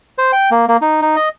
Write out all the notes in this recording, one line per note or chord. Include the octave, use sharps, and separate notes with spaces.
C5
G5
A#3
A#3
D#4
D#4
D#5